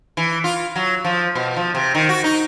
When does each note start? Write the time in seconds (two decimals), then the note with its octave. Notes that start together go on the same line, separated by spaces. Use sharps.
0.17 E3
0.44 F4
0.76 F#3
1.04 F3
1.35 B2
1.56 F3
1.75 C3
1.95 D#3
2.09 F#4
2.24 D#4